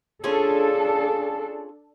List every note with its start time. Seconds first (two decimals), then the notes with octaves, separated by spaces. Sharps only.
0.24 C#4 D4 F4 G#4 A4